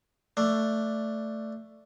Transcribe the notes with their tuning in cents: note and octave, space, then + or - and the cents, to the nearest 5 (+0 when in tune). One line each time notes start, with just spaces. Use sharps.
A3 +10 D4 +0